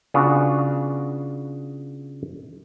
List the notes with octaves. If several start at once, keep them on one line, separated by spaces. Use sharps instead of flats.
C#3 B3 D4 F4 F#4